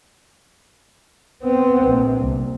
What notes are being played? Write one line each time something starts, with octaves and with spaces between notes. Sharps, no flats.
B3 C4
A#1
C2